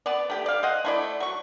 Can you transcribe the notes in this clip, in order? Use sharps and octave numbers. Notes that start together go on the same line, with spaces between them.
B3 D5
A3 G4 G5
D5 F5
C5 D#5 F#5
A3 E4 D5
F#3 C#6